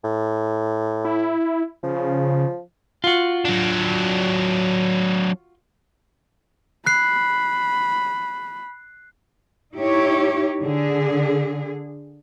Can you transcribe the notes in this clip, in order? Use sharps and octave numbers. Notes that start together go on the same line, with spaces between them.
A2
E4
C#3 F3
F4 F#4
F#3 D4
B5 F#6 C7
D#4 E4 G4 C#5
D3 G#4